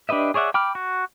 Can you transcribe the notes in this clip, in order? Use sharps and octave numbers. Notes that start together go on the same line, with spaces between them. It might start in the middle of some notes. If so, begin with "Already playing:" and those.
D4 G4 B4 D#5 E5
G#4 C#5 D5 E5 F#5
G5 B5 D6 F6
F#4